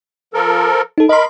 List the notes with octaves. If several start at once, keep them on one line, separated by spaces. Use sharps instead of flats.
F3 A4 A#4
D#4 A4
A#4 D#5 B5 C6